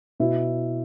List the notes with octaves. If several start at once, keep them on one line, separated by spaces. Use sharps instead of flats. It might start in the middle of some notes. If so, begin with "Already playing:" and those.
B2 E4